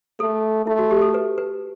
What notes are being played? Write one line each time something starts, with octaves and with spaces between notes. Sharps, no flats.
A3 A4
A3 E4
F#4
G4
A4
B4
B4